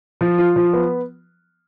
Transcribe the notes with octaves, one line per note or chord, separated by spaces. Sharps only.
F3
F4
F3
B3